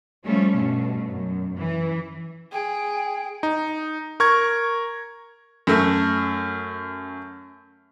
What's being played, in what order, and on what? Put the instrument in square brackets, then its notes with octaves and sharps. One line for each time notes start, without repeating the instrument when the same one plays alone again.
[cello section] F3 G3 A3 C#4
G2 B2 A3
F#2
E3
[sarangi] G#4 [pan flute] G5
[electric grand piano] D#4
A#4 C#6 G#6
[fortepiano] F#2 A3